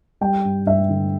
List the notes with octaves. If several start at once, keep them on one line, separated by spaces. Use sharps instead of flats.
G3 G5
G2
G2 E5
D3